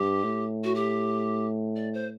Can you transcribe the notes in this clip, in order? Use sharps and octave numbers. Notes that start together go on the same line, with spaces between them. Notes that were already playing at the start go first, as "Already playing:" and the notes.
Already playing: G2 G4
A2
F#4
G4
D5
C5